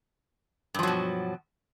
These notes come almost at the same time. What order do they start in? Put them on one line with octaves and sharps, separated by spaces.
G2 F3 F#3 B2